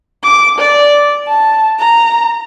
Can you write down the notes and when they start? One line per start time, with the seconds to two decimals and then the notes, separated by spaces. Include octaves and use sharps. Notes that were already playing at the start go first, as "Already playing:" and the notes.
0.24 D6
0.59 D5
1.27 A5
1.80 A#5